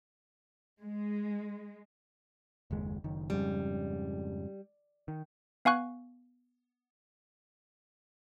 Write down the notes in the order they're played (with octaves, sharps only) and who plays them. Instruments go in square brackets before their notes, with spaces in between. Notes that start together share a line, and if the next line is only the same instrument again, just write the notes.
[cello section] G#3
[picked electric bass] F#1 D#2 G#3
F#1 D#3
[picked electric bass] F2 G#2 C#3 [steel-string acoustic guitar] G3
[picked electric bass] D#3
[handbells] B3 F5 G#5 C#6 F#6